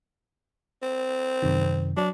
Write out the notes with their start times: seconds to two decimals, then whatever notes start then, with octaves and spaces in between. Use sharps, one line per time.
0.83 C4
1.42 F#2 C3 D#3
1.97 F#3 D4